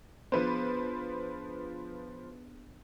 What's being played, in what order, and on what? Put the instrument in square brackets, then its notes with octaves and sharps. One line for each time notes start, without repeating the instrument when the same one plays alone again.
[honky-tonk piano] F3 B4 C5 [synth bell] B3 D4 G#4